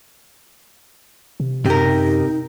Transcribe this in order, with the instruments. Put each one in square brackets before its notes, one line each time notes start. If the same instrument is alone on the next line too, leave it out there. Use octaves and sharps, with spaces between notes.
[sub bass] C3
[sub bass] F#2 [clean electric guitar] C3 [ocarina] D#4 [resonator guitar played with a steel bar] G4 A#4